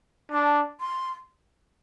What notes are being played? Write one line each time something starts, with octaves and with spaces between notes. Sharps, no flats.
D4 A5
C6